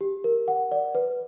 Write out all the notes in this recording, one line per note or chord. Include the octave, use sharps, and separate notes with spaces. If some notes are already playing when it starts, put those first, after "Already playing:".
G4
A#4
F#5
D5
B4